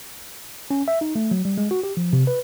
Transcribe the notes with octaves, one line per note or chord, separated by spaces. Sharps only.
C#4
E5
D#4
A3
F#3
G3
G#3
F#4
G4
F3
C3
B4